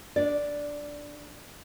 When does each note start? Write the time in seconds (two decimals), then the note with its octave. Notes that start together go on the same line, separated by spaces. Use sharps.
0.16 D4 D5